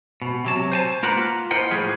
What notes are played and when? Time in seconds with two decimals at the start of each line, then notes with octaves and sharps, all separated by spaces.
0.22 B2
0.45 C3 F#3 A5
0.72 C5 G#5 A5
1.03 A#3 F4 A#4 B4 F#5
1.51 E4 A#4 C5 D#5 F#5 G5
1.71 A2 F3 A#3 F4 G#4 B4